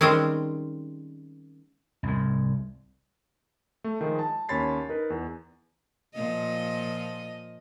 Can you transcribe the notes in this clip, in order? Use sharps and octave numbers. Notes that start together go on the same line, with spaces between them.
D#3 G3 G#3 C4 C#4
C2 G#2
A3
D#3 F3 G#3
A5
D#2 C#4 C#5 B5 A6 C7
D#4 A#4 B4
E2
A#2 F3 D#5